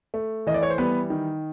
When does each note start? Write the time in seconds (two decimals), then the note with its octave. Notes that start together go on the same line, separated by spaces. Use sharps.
0.14 A3
0.47 E3 D#5
0.54 D5
0.63 C#5
0.70 C5
0.78 G3 B3 B4
1.10 D#3